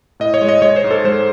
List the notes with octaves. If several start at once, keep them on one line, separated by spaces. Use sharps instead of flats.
A2 D#5
C#5
G#3
D#5
G#3 C#5
C5
G#2
A4
G#3 C5